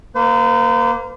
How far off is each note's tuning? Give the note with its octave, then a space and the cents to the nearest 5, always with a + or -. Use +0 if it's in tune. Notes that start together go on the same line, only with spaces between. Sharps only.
A#3 +0 C5 -45